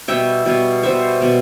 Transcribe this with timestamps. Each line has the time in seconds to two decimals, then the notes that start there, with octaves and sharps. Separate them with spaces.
0.08 B2 G3 B3 E5 G5
0.45 B2 G3 B3
0.83 B2 G3 B3 C5 E5
1.20 B2 G3 B3